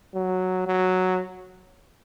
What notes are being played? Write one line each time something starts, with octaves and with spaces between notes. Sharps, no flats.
F#3
F#3